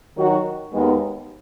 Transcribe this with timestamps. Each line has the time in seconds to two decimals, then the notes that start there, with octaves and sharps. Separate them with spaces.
0.16 D#3 F#3 D#4 F#4
0.72 D#2 D#3 G#3 B3